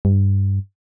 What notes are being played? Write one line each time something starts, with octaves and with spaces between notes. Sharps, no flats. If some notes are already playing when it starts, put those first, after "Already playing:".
G2